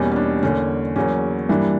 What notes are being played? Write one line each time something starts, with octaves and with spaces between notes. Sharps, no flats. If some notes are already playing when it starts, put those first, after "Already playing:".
Already playing: E2 B2 G3 A#3 C#4
C#4
D4
E2 D3 A#3 C#4
E2 C#3 F#3 A#3 C#4
G2 E3 G3 A#3 D4